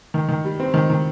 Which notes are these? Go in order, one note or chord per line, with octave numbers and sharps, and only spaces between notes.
D#3
D#3
G3
C4
D#3
D#3